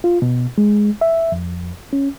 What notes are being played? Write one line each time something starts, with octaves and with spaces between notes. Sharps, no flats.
F4
B2
G#3
E5
F2
C#4